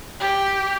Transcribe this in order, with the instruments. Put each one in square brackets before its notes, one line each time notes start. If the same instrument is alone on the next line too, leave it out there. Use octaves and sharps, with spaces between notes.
[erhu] G4